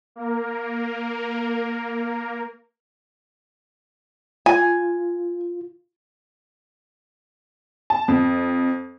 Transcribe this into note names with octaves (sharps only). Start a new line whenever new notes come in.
A#3 A#4
F4 G#5
A5
F2